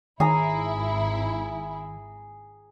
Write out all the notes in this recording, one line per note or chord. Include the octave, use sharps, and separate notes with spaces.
G#1 D#3 E4 G#4 A#5